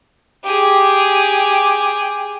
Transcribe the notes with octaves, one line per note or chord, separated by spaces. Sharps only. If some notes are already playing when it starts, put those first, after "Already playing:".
G4 G#4